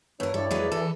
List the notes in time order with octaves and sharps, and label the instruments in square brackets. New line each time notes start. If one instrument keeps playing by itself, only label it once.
[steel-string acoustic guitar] G2 A#4 [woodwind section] B3 D4 E4 [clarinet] C#5
[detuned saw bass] G2 [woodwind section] E4 D5 [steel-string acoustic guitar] A4
[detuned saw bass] F2 [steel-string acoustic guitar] F#3 G#3 B4
[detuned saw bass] E3 [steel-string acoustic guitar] A4